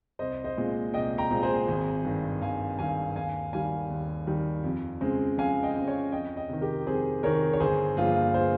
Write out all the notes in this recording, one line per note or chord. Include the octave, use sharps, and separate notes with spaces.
C2 C5 D#5
C5 D#5
A#2 G#3 C4
C2 D#5 G5
G5 A#5
A#2 G#3 C4
G#4 C5
G#1
G2 D#3
G#1 F5 G#5
G2 D#3 F5 G#5
D#2 F5 G#5
D#3 G3 F5 G#5
D#2
D#3 G3
F2
C#3 G#3 C4
F2 F5 G#5
D#5 G5
C#3 G#3 C4
C#5 F5
F2 D#5 G5
D#5 G5
C3 D#3
G4 A#4
F2 G#4 C5
C3 D#3 A#4 C#5
C#5
G1 G#4 C5
G2 F3 A#3 F4 G#4
G#4 C5